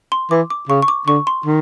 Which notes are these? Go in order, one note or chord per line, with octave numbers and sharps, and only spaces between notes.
C6
E3 D6
D6
C#3 C#6
C#6
D6
D3 C#6
C6
D#3